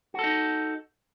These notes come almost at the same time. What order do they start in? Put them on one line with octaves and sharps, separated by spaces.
F#4 A4 D#4